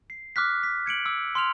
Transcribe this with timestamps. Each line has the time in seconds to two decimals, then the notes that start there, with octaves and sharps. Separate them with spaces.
0.10 C7
0.36 D6 F6 F#6 B6
0.63 B6
0.86 G#6 C#7 D7 F#7
1.06 D6 E6
1.35 C6 F6 F7